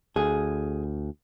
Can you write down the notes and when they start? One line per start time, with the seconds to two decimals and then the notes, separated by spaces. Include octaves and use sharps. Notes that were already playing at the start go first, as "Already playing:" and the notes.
0.16 D2 G#4